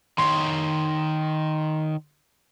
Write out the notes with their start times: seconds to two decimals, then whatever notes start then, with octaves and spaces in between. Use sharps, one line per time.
0.18 D#3 C#5 C6